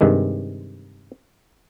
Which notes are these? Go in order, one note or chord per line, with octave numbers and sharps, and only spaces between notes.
G2 C3 D#3 G#3